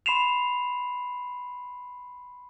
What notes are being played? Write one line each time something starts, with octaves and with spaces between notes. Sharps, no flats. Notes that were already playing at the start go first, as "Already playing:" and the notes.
B5 C6 C7 E7 F7